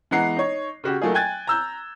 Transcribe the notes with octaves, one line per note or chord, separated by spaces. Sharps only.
E3 G#3 B3 F#5 A#5 C7
D#4 C#5
C#3 F#4 G4
F#3 A3 A#3 D#4 F4 G#4
G5 G#5 F#6 G#6 A6
A#5 E6 G6